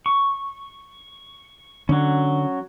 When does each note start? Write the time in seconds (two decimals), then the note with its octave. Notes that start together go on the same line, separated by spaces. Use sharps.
0.06 C#6
1.89 D3 F#3 C#4